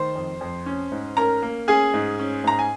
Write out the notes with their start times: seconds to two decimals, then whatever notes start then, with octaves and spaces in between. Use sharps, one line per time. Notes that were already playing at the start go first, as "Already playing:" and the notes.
Already playing: D#3 C5 C6
0.15 F2
0.41 F2
0.66 C#4
0.92 G#2
1.17 C#4 A#4 A#5
1.42 A#3
1.68 C#4 G#4 G#5
1.94 G#2
2.19 C#4
2.44 G#2 A#5
2.59 G#5